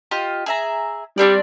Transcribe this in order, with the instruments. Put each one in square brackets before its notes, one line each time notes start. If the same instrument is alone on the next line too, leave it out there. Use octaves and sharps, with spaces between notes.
[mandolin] F4 G4 D#5
G#4 E5 A#5
[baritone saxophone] G3 [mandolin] C4 D4 D5